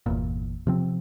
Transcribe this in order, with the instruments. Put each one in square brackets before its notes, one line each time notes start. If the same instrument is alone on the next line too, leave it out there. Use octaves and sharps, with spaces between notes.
[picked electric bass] G1 E2 A#2
C3 F3 C4